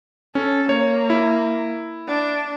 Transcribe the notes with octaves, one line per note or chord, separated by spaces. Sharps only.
C#4 A4
A#3 C#5
E4
D4